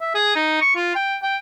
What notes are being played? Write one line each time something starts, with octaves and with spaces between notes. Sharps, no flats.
E5
G#4
D#4
C#6
F4
G5
G5